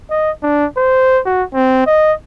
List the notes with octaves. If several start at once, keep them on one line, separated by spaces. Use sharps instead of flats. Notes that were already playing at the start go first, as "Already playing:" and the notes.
D#5
D4
C5
F#4
C4
D#5